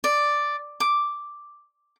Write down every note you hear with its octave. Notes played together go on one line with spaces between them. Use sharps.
D5
D6